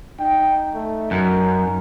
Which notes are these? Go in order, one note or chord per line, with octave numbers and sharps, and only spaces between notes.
D#4 G5
A3
F#2 A#4